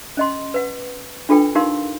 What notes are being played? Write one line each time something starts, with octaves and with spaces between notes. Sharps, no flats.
C#4 D#5 C6
B4 F#5
D4 F4 A4 B4 G5
D#4 G4 A#4 F5 C6